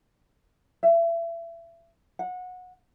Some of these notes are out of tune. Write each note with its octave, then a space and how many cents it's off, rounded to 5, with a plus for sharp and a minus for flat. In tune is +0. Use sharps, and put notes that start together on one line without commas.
E5 +30
F#5 -25